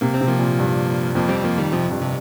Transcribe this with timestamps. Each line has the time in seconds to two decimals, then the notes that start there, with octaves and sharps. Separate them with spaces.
0.01 C3 A#3
0.14 C4
0.21 C3
0.27 F3 A#3
0.39 A#2
0.59 G2
1.15 F2 F3 A#3
1.29 G3 C4
1.43 F3 A#3
1.57 D#3 G3
1.72 F2 C3 F3
1.91 G2
2.01 C3